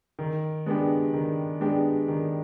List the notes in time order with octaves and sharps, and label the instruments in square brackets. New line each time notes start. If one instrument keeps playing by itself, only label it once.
[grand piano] D#3
G#3 B3 D4 G4
D#3
G#3 B3 D4 G4
D#3